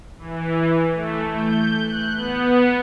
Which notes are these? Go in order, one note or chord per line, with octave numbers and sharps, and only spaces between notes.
E3
A3
G6
F#6
B3